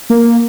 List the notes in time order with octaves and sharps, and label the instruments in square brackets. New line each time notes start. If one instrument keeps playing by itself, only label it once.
[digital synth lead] A#3